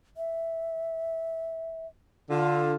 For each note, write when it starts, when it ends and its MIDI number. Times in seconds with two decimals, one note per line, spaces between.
0.17 1.87 76
2.30 2.75 50
2.30 2.75 65